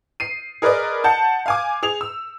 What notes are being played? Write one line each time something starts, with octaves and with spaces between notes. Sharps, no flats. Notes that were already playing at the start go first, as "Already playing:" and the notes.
C7 D#7
G#4 A#4 B4 D5 D#5
F#5 A5 G6
F5 G#5 D6
G#4 F7
E6